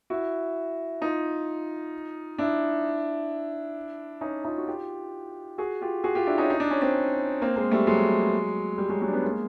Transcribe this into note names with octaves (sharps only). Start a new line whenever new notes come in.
E4 F#4
D#4 F4
D4 E4
C#4 D#4
D#4 F4
F#4
F4 G4
F#4 G#4
F4 G4
F#4 G#4
F4 G4
D4 E4
C#4 D#4
D#4
D4
C#4
C4 D4
A#3 C4
G#3 A#3
G3 A3
F#3 G#3
G3
F#3 G#3
F#3 G#3
D4
B3 C#4
G#3 A#3